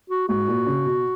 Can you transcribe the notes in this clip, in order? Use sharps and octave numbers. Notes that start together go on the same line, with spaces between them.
F#4
G#2 F#4
A#2
C#3
B2